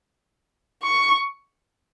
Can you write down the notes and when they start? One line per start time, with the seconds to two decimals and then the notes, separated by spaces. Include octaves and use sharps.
0.83 C#6